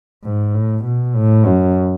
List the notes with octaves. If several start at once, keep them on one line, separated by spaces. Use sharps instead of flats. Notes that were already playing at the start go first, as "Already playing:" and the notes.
G#2
A2
B2
A2
F#2